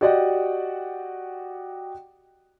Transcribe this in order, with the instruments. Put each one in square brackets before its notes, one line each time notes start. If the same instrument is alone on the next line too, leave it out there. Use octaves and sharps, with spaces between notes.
[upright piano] F#4 G4 D5 D#5 F#5 G5